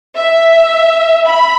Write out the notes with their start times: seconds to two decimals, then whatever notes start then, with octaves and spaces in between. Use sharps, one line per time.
0.16 E5
1.25 B5